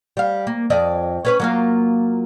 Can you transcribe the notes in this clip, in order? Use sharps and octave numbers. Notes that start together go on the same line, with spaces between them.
G3 F5
A#3
F2 D5 D#5
C#4 B4 C#5
F#3 A#3 F4